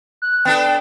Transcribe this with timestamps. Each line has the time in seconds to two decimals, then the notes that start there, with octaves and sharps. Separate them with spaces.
0.22 F#6
0.45 B3 D4 A4 G5